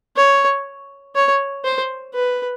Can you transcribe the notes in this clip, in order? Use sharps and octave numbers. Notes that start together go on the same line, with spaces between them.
C#5
C#5
C5
B4